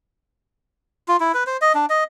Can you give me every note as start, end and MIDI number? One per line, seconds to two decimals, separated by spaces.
1.08 1.17 65
1.20 1.32 64
1.34 1.44 71
1.47 1.57 72
1.62 1.73 75
1.75 1.86 62
1.90 2.04 75